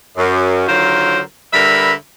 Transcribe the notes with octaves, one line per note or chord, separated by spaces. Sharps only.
F#2
D3 D#3 F#3 F4 A#4 C5
D3 G3 A#4 B4 E5 B5